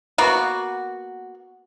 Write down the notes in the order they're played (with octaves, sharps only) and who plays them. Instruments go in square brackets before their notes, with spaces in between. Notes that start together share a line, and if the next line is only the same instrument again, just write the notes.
[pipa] A#3 B3 F#4